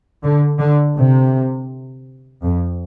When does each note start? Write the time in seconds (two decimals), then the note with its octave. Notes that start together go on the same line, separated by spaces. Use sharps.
0.23 D3
0.59 D3
0.97 C3
2.43 F2